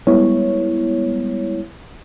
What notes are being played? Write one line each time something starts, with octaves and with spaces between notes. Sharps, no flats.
G3 G#3 B3 E4 C#5